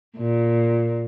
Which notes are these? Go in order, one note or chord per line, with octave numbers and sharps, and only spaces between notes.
A#2